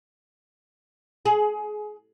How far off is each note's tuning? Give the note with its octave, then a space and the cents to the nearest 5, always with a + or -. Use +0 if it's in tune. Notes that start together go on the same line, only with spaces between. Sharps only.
G#4 +25